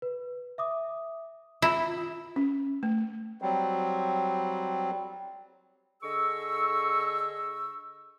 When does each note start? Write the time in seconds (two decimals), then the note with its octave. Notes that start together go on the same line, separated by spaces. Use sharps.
0.02 B4
0.58 E5 D6 D#6
1.62 E4 F4
1.98 F4
2.36 C#4
2.83 A3
3.42 F#3 G3 C4
6.03 D3 G#4 D#5 C#6 E6